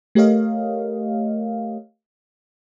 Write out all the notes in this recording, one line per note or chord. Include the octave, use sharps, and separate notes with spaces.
A3 G4 A#4 C#5 D#5 F5